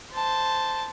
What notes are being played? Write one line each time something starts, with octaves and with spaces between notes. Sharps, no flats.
C5 A5